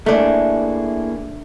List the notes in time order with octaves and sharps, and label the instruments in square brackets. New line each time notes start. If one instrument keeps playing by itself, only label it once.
[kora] A3 D4 [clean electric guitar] A#3 E4 G#4